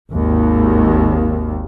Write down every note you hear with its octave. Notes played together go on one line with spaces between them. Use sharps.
G#1 D#2